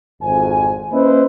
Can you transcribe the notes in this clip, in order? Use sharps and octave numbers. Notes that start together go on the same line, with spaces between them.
G#1 F2 G#5
A#3 C#4 E4 B4 C5 D#5